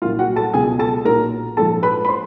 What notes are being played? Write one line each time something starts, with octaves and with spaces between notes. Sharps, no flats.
C2 A#2 F#3 F4 F5
F#4 F#5
A4 A5
C#2 B2 F#3 G#4 G#5
A4 A5
B1 A#2 F#3 A#4 A#5
A#1 G#2 F3 A4 A5
B4 B5
B5
C5 C6